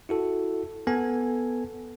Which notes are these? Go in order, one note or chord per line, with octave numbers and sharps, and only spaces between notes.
E4 F#4 A4
B3 A4 G#5